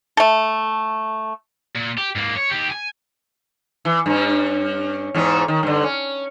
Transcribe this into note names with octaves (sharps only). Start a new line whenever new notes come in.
A3 A4
A#2
G4
G#2 A#3
C#5
D#3 G4
G#5
E3
G2 C#4
E2 G#2 C#4
D#3
G2 D3
C#4